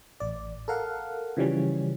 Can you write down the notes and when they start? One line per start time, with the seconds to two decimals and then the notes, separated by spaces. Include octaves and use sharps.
0.20 A1 D5
0.68 A4 A#4 F5 F#5
1.37 C#3 E3 F3 G3 C#4